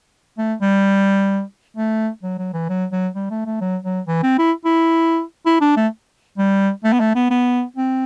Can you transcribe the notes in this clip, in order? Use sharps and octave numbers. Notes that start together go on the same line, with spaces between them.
A3
G3
A3
F#3
F#3
E3
F#3
F#3
G3
A3
A3
F#3
F#3
E3
C4
E4
E4
E4
D4
A3
G3
A3
B3
A3
B3
B3
C4